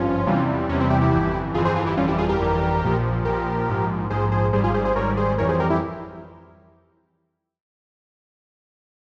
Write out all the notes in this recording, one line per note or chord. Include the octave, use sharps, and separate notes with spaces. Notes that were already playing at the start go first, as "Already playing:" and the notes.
Already playing: G#1 G2 F3 C#4 F4
E2 C3 E3 G3
E2 C3 E3 G3 C#4
C4 E4
E4 G4
E4 G4
G1 F2 E3
G1 F2 E3 F4 G#4
G#4 C5
F4 G#4
E4 G4
G1 F2 E3 G3 C#4 F4
E4 G4
F4 G#4
G4 A#4
G1 F2 E3 G3
A#1 A#2 F3
A#1 A#2 F3 G4 A#4
A#1 G#2 F3
A#1 G#2 F3 G#4 C5
G#4 C5
G#1 G#2 G3 G#4 C5
F4 G#4
G#4 C5
G#4 C5
G#1 G#2 G3 A#4 C#5
G#4 C5
F2 E3 G3 A#4 C#5
G#4 C5
G4 A#4
E4 G4